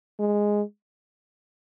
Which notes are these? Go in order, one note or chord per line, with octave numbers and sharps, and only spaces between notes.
G#3